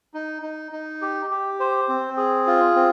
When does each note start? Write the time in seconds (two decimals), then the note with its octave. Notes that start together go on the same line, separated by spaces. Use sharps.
0.14 D#4
0.42 D#4
0.72 D#4
1.02 G4
1.31 G4
1.60 C5
1.89 C4
2.17 G#4
2.47 F4
2.75 C4